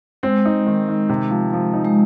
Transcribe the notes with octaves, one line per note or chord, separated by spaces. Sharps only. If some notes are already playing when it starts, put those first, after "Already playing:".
G#3 C4
D#4
D#3
D#3
C3
F3
F3
D#4
G#3